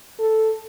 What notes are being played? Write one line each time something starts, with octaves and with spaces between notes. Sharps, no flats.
A4